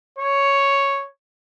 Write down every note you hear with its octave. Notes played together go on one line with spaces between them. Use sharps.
C#5